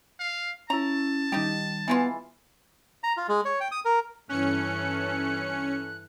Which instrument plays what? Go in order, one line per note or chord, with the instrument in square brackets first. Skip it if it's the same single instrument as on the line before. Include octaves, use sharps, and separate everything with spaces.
[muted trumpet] F5
[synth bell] C#4 E4 [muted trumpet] A5 [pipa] A#5
[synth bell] D#3 G3 [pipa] D#4 G4
[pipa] E3 G#3 F4 [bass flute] B3
[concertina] A#5
F4
G#3
C#5
G5
D#6
A#4
[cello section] G2 E3 A4 [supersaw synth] C#4 C#7 [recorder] F#6